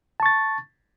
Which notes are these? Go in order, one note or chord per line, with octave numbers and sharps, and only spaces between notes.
A5 C#6 A6